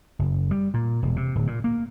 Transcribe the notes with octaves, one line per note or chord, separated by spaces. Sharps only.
F#1
G3
A#2
E1
C3
D1
A#2
A#3